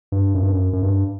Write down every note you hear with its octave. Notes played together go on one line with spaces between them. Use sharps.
G2
F#2
G2
F#2
F#2
G2